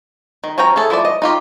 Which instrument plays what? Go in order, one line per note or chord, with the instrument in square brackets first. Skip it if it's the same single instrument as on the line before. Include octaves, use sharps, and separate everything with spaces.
[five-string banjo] D#3
F3 C#4 F#4 G5 A#5
A3 G#4 A4
F3 E4 C5 D5
D#5
D#4 F4 G4